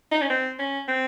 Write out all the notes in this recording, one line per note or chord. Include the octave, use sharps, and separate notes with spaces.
D#4
C#4
C4
C#4
C4